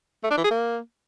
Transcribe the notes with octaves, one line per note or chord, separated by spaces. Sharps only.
A3
D4
E3
G#4
A#3